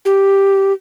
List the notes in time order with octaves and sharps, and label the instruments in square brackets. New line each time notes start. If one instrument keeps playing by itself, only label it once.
[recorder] G4